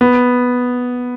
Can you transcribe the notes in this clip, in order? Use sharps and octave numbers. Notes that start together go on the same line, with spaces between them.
B3